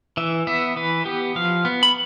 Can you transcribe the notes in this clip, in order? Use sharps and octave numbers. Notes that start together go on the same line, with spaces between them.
E3 E5
B3 E5
E3 B4
B3 G4
F3 F5
B3
B5